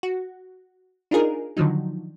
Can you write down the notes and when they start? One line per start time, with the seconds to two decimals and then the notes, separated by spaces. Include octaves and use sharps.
0.03 F#4
1.11 D4 D#4 F4 G#4 A#4
1.57 D3 D#3 F3 F#3 D#4